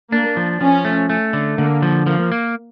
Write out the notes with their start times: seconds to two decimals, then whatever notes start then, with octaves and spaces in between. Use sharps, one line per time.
0.12 A#3 D4
0.37 F3
0.61 F3 C#4
0.85 A3
1.10 A3
1.33 D3
1.58 D3 A#3
1.82 F3
2.07 F3 A#3
2.32 A#3